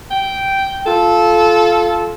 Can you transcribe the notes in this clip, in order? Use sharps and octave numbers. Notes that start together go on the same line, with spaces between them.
G5
F4 A4